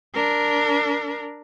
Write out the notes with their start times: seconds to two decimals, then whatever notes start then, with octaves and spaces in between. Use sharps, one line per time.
0.14 D4 A#4